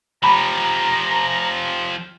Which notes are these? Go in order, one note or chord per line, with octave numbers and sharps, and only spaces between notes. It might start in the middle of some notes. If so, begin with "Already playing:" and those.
F3 G4 A#5 B5